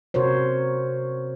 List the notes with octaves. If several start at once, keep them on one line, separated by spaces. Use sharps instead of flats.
C3 F#4 A#4 C5 C#5